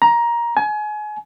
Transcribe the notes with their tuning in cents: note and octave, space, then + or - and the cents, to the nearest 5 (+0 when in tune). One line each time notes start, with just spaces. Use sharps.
A#5 +15
G#5 +30